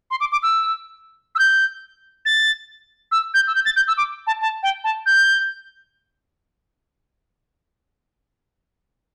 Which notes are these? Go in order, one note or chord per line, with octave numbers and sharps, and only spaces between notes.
C6
D6
D6
E6
E6
G6
A6
E6
G6
E6
G6
A6
G6
E6
D6
A5
A5
G5
A5
G6